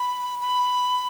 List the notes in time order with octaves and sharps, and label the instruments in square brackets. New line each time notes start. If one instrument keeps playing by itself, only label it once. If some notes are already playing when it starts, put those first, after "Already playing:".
Already playing: [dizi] B5
B5